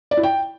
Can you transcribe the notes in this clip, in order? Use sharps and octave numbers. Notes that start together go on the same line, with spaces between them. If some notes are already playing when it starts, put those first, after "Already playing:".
D5
E4
G5